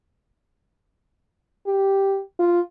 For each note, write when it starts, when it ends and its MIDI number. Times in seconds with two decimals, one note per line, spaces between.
1.67 2.21 67
2.39 2.61 65